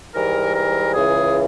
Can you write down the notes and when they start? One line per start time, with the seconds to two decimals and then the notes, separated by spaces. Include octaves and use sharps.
0.14 G#2 E3 G3 A#4
0.55 A#4
0.94 C#2 C#3 E3 G#4